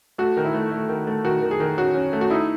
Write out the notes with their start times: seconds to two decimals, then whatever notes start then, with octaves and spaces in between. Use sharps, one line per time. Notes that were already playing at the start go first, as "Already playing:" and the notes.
0.18 A3 F#4
0.37 D#3
0.45 E4
0.54 A3
0.72 A3
0.89 D#3
1.07 A3
1.25 D#3 F#4
1.42 D#3
1.51 G#4
1.60 D#3
1.77 C#4 F#4
1.95 C#4
2.13 A3
2.21 F#4
2.30 D#4 E4